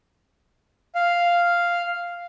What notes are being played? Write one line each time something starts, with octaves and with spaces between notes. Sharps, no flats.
F5